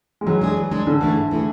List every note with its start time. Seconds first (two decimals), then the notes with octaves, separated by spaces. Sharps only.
0.21 G#3
0.26 E3 F#3
0.42 G#3 D4 G#4
0.57 E3
0.71 G#3 D4 G#4
0.86 G#2 D3
1.01 E3 A3 E4 G#4
1.17 G#2
1.31 E3 A3 E4 G#4